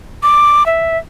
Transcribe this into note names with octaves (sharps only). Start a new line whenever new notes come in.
D6
E5